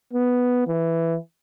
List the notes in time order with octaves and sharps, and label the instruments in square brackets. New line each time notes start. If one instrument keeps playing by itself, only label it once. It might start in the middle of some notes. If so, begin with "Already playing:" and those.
[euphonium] B3
E3